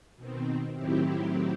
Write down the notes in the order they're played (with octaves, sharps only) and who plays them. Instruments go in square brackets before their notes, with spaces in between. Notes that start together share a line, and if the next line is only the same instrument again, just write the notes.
[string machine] B2 D#3 C4
A2 D#3 F#3 C4 E4 G4